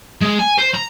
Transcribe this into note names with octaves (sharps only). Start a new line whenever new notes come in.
G#3
G#5
C5
A#5